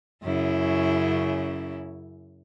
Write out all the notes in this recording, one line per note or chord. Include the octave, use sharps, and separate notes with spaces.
F#2 C#3 E4